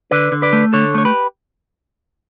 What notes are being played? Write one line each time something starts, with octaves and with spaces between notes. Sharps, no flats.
D3 B4 D5
D3
B4 D5
A3
D3 A4 C#5
A3 C#5
G4 B4